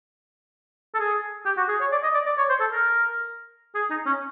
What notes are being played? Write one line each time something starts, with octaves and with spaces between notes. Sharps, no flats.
A4
G#4
G4
F#4
G#4
C#5
D5
D#5
D5
D5
C#5
C5
A4
A#4
G#4
D#4
C#4